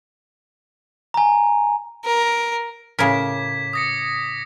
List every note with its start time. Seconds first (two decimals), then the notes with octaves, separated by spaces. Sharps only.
1.14 G#5 A#5
2.05 A#4
2.99 A2 C#3 A#4 D6 G#6 B6
3.73 D#6 A#6 C#7